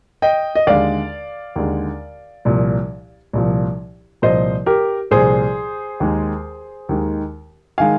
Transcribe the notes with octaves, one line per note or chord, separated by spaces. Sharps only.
D#5 G5
D#5
D#2 D3 G#3 D5 F5
D#2 D3 G#3
C2 A#2 F3
C2 A#2 F3
C2 A#2 F3 C5 D#5
G4 A#4
C2 A#2 F3 G#4 C5
D#2 D#3 G#3
D#2 D#3 G#3
D#3 G#3 F5 G#5